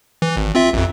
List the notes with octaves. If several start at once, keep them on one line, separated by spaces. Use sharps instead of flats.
E3
G#1
C4 F4 E5
A1 F2